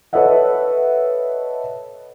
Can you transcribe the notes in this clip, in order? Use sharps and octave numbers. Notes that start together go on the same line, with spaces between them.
A4 B4 C#5 D#5 E5 F#5